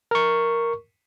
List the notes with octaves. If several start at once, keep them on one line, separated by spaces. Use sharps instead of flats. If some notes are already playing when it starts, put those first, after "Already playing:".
A#4 C#6